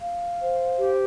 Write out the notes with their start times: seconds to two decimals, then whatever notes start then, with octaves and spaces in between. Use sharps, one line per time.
0.01 F5
0.40 C5
0.79 G4